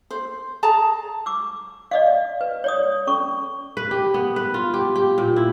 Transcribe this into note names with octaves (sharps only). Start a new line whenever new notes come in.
C5
G#4 A5 A#5
D6 E6
D5 D#5 F5
B4
C#5 D5 D#6
C#4 A4 C#6
B4
G4
B3
B4
F4
G4
G4
A#2
E4